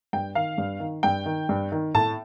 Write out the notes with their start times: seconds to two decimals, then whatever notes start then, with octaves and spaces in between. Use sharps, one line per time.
0.13 G2 G5
0.35 D#3 F5
0.58 G2
0.80 D#3
1.03 G2 G5
1.26 D#3
1.49 G2
1.72 D#3
1.94 A2 A5